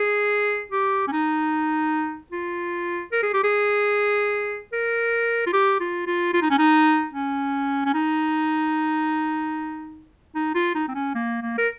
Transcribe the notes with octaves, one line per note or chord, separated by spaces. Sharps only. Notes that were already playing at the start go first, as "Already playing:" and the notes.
Already playing: G#4
G4
C#4
D#4
F4
A#4
G#4
G4
G#4
A#4
F4
G4
F4
F4
F4
D#4
C#4
D#4
C#4
C#4
D#4
D#4
F4
D#4
C4
C#4
A#3
A#3
A#4